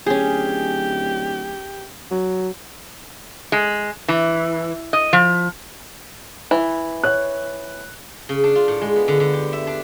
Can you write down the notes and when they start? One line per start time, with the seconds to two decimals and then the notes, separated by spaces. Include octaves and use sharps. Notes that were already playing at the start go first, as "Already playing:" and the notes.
0.06 D1 C#4 G4 G#4
2.11 F#3
3.52 G#3
4.08 E3
4.93 D#5
5.13 F3
6.51 E3
7.04 C#5 F#6
8.29 C#3
8.44 D4
8.55 F4
8.68 A2
8.81 G#3
8.96 B3
9.08 D3
9.20 D3
9.33 G4
9.53 E5
9.67 D4